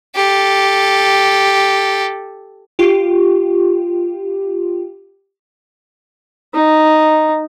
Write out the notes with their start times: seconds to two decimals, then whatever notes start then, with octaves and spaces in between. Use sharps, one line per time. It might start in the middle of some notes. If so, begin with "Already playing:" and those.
0.15 G4 A4
2.79 F4 G4
6.54 D#4